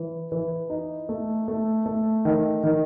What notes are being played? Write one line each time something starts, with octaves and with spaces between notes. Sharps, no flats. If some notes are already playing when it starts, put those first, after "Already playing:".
Already playing: E3
E3
D#4
A3
A3
A3
D#3
D#3